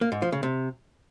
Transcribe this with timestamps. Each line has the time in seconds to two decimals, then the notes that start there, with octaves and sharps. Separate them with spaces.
0.01 A#3
0.12 G#2
0.22 F3
0.32 C#3
0.43 C3